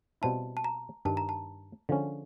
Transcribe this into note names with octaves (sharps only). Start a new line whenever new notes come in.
B2 G3 C4 E4 A5
A5
A#5
G2 D#3 G3 A5
A#5
A5
D3 F3 G#3 C#4